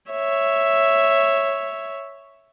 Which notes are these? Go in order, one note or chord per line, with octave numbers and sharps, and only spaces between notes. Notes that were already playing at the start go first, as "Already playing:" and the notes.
C#5 E5